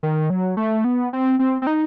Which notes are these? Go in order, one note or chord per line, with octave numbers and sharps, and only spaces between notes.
D#3
F#3
A3
B3
C4
C4
C4
D#4